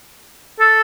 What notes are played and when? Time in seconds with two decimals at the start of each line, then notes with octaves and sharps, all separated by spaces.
0.60 A4